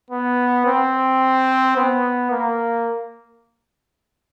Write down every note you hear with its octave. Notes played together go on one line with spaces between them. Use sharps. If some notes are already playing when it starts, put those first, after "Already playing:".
B3
C4
B3
A#3